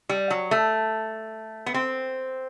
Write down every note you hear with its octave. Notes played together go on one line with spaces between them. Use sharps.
G3
F#3
A3
B3
C4